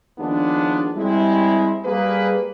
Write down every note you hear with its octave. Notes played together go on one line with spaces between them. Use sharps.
D#2 F3 G#3 B3 D4
G3 G#3 C4 E4
G3 A#3 G#4 B4